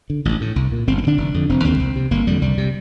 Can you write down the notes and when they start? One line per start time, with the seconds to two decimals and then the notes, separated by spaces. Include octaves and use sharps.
0.10 D3
0.25 A1
0.41 A2
0.56 C2
0.72 A#2
0.87 G1 C4
0.98 C4
1.03 G2
1.07 D3 D4
1.18 F1
1.34 F2 D3
1.49 F1 C4
1.64 D#2 D3 C4
1.80 C2
1.96 C3
2.11 G1 A#3
2.27 F2 D3 G3
2.41 C2 G3
2.58 C3